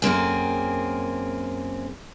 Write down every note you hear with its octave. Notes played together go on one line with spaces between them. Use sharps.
F#2 A#3 C4 G#4